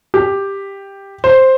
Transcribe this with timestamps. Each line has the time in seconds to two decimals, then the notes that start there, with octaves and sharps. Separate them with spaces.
0.14 G4
1.24 C5